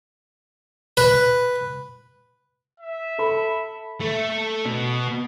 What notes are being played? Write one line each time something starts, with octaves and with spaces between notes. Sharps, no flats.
B4
E5
A4 B5
A3
B2